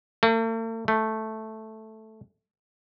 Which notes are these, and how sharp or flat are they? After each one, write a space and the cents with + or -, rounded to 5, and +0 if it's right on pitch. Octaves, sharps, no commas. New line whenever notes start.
A3 +45
A3 -5